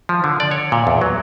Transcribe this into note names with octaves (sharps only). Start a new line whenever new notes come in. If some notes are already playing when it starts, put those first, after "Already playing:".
F3
D3
D5
C#5
A#2
E2
F#3